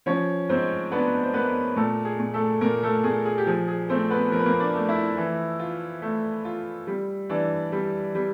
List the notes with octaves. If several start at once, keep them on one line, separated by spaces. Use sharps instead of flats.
F3 C#4 C#5
G#2 C4 C5
B3 D4 B4
C5
A#3 B3 B4
A#2 A3 A4
G#4
A#2
A3 A4
A#2 A#3 A#4
A3 A4
A#2 G#4
G#4
G4
F3 G#4
G#4
A3 C4 C5
B3 B4
F3 A#4
B4
A#3 A#4
D4 D5
A3
E4 E5
E3
F4
A3
F4
G3
E3 D4 D5
G3
G3